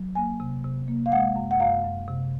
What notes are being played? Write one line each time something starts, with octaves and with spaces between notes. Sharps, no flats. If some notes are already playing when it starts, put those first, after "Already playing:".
Already playing: F#3
A#3 G#5
C3
C3
A#3
F5
G#3 F#5
F#2
F#5
F#2 F5
F#2
C3